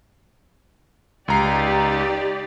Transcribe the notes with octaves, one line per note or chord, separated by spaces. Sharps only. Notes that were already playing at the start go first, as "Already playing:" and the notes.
C#2 D#4 G4 D5 A#5 C7